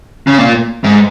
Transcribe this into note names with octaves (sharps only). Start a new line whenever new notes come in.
C#3
A#2
G#2